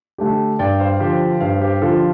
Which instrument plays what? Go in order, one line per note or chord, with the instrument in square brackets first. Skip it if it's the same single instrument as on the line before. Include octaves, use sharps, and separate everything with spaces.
[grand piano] D3 A3 D4 G4
[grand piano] G2 [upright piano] D5 G5
[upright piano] C5 F5
[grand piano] D3 F3 [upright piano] G4 C5
[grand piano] G2 [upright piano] C5 F5
[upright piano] G4 C5
[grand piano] D3 F3 [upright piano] F4 A4